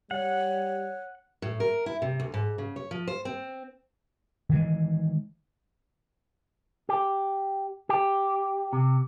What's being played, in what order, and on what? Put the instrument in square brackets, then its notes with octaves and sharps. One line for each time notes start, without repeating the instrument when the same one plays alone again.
[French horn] G3 [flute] C#5 [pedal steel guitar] F#5
[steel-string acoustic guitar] A2
A#4
E4
C3
D2
G#2
C#3
C#5
F3
C5
C4
[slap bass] D#3 E3 G#3
[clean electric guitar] G4
G4
C3